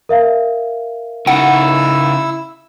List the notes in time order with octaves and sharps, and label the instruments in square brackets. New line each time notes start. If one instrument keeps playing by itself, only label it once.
[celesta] A#4 E5 F5
[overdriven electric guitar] C#3 D#4 [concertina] E4 E6 [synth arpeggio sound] F#5